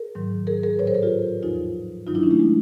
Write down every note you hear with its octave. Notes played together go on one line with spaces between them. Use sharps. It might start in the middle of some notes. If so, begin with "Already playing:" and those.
Already playing: G#4 A#4
G#2 D#3 F#3
G#4 A#4
G#4 A#4
A2 F#3 B4 C#5
A#4 C5
A4 B4
F4 G4
E2 C#3 F3 D#4 F4
G2 D#3 F#3 D#4 F4
D4 E4
C#4 D#4
A3
G#3